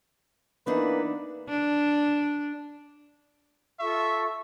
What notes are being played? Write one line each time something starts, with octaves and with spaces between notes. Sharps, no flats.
E3 A#3 B3 D4 D#4 B4
D4
F4 A4 E5 C#6